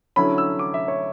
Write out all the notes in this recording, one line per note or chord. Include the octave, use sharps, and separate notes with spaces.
D3 F#3 C#4 E4 B5
E6
D6
E5
C#5